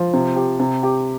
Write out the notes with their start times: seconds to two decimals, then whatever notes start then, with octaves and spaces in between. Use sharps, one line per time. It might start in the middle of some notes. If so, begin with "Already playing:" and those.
Already playing: F3
0.13 C3
0.36 G4
0.59 C3
0.83 G4